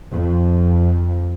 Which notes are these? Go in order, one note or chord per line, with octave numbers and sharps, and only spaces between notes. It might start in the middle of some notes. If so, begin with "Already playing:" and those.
F2